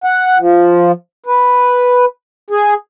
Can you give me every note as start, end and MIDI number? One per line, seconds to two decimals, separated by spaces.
0.04 0.38 78
0.39 0.92 53
1.26 2.05 71
2.51 2.74 68